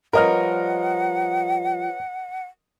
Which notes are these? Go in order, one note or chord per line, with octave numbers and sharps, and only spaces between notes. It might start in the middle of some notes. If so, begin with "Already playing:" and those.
F3 G3 A#4 B4 C#5 D#5 F#5 F6